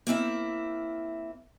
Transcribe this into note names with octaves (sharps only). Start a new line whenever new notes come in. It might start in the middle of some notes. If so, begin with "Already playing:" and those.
A#3 C4 E4 E5